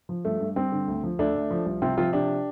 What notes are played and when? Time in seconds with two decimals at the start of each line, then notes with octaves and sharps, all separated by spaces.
0.09 F3
0.25 G2 A3
0.40 G2
0.56 G2 C4
0.72 D3
0.88 D2
1.04 F3
1.19 D2 A3 D4
1.35 D2
1.51 F3
1.66 C2
1.82 C3 C4 F4
1.98 F3 C4 F4
2.13 C3 D4 G4